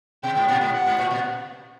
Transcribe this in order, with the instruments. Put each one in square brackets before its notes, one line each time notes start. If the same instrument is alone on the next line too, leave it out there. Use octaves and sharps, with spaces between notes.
[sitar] B2 [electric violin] G5
[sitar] G#2
A#2
G#2
[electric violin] F#5
[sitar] G#2
A2
A#2